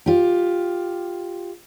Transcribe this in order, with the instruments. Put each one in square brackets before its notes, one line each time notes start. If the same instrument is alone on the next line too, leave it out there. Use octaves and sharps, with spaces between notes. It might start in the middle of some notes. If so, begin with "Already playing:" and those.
[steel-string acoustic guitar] F4 G4